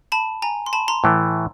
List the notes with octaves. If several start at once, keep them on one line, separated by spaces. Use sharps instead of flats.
A5 B5
G#5 A#5
C6
A5 B5
A#5 C6
A2 E3 A3